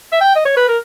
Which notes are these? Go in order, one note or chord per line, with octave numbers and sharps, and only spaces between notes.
E5
G5
D#5
C#5
B4
A#4